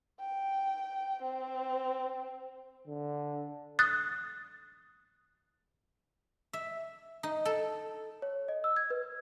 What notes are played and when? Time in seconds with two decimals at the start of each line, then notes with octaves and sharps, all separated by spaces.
0.20 G5
1.22 C4
2.88 D3
3.79 D#6 F#6 A6
6.53 E5
7.23 D#4
7.45 A4
8.22 C#5
8.48 D#5
8.64 E6
8.77 G#6
8.90 B4